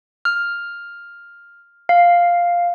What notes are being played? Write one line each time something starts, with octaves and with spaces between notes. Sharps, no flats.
F6
F5